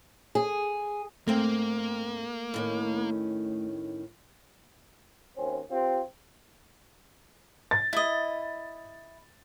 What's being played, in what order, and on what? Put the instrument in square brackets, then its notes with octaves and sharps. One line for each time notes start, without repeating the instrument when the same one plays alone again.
[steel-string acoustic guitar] G#4
[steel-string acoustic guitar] G#2 C4 G5 [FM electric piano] A3 [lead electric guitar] A#3
[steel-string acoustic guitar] A2 D#3 C#4
[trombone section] D#2 C4 C#4
C4 F4 G4
[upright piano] A6
[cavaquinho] E4 D#5